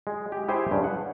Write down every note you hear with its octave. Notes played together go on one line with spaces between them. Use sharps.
G#3
G4
E4 G4 G#4 C5 G5 G#5
G2 C#3
F#5